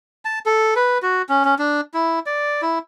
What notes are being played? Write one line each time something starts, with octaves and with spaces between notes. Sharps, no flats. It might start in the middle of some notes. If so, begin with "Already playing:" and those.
A5
A4
B4
F#4
C#4
C#4
D4
E4
D5
E4